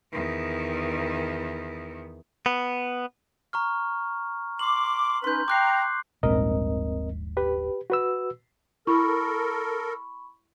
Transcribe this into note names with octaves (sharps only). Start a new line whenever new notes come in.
E2 D#3
B3
A#5 C#6 F6
C6 D6 F#7
C#4 D#4 B4 C6 G6
G5 A#5 D6 F#6 C7
D#1 A#1 G#2 C4 A#4 D#5
G4 B4
F#4 B4 E6
E4 A4 A#4 B5 C#6